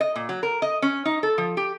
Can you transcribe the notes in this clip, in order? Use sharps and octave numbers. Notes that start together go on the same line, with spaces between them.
D#5
A#2
F#3
A#4
D#5
C#4
D#4
A4
F3
G4